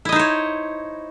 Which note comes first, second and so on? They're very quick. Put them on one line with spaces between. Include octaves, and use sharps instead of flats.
E4 D#5 D#4 C5 C#5